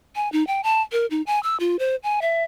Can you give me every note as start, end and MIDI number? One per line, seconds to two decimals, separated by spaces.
0.16 0.31 80
0.32 0.46 63
0.47 0.61 79
0.64 0.82 81
0.92 1.06 70
1.11 1.22 63
1.27 1.41 80
1.43 1.56 88
1.60 1.76 65
1.79 1.96 72
2.03 2.20 80
2.22 2.44 76